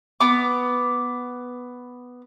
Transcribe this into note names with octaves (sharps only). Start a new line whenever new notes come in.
B3 D6